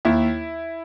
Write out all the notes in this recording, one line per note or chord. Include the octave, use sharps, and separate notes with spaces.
D#2 E4